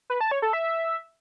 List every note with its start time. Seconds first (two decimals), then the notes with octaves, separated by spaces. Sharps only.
0.10 B4
0.21 A5
0.31 C#5
0.42 A4
0.53 E5